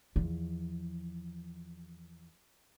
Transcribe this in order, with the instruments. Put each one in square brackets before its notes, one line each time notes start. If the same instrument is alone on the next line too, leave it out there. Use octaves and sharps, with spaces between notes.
[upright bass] E2 F3